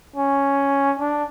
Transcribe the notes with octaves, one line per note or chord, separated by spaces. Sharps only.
C#4
D4